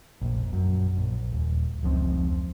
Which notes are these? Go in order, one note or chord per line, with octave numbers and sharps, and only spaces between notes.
F1 A#1
F#2
A#1
D#1
F1 C#2 F3 C4